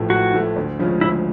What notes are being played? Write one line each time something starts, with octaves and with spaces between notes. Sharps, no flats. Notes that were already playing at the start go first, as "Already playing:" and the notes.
Already playing: A1 A2 F3 A3
A1 F#4
A2 F3 A3
D2
C#3 F3 G#3 C#4
D2 E4